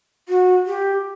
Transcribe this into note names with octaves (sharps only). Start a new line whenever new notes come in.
F#4
G4